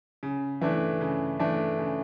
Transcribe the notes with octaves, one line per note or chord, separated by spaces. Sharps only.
C#3
E3 A3 D4
C#3
E3 A3 D4
C#3